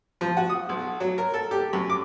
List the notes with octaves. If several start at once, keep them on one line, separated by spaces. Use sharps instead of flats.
F3
F#4
D#6
B1
F#3
A#4
A4
G4
F#2
D6